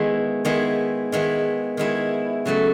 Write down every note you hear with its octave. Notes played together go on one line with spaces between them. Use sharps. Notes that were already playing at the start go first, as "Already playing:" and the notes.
Already playing: D#3 G#3 B3 E4
D#3 G#3 B3 E4
D#3 G#3 B3 E4
D#3 G#3 B3 E4
C#3 F#3 A3